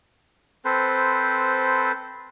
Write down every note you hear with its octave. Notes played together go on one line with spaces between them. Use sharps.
C4 A4 B4 C5